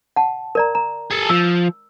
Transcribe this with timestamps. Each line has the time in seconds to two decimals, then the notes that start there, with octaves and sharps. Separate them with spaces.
0.16 F#5 A5
0.55 A#4 D5 A#5
0.75 A#5
1.11 G#4 A4
1.29 F3 E6